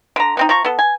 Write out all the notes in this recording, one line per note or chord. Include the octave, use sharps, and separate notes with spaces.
D3 A#5
B3 C4 D#4
F3 A#5 C#6
B3 A4
G#5